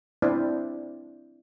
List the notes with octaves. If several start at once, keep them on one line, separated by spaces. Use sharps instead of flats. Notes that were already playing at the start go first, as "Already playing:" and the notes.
C4 D4 E4 C5 D5